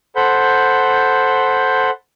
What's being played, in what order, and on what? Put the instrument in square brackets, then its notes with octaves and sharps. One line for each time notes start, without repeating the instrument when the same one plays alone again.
[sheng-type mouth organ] A4 C5 F#5 B5 G6